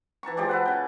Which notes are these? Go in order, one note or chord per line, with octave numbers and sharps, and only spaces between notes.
E3 A5 A#5 C#6
F3 G#3 G4 D5
A4 B4 F#5
C#3 G5